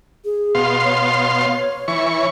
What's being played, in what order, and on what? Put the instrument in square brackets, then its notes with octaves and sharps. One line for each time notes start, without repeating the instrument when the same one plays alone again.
[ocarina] G#4
[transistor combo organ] B2 F5 C6
[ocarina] C#5
[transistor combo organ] E3 C#6